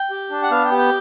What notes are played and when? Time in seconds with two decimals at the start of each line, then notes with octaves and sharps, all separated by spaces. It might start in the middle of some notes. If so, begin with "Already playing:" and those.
Already playing: G5
0.10 G4
0.30 D4
0.42 F#5
0.51 B3 F5
0.65 G5
0.71 G4
0.78 G5